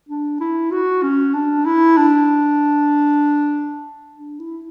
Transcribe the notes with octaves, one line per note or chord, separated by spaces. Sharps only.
D4
E4
F#4
C#4
D4
E4
D4
D4
E4